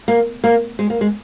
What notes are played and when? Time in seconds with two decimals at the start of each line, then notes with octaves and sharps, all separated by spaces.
0.08 A#3
0.44 A#3
0.79 G#3
0.90 A#3
1.01 G#3